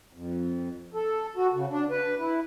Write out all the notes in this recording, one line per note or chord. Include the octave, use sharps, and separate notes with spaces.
F2
A4
F#4
C#3
D4
B4
E4